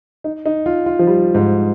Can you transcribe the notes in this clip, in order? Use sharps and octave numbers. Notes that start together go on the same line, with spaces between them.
D#4
D#4
F4
F4
F3
G3
G#2